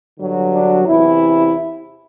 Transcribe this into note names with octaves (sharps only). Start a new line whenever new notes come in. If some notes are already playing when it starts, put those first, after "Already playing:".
G2 D3 F#3
D4
E2 C3 E3 E4